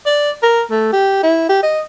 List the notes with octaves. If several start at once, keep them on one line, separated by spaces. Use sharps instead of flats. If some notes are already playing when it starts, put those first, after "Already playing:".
D5
A#4
A3
G4
E4
G4
D#5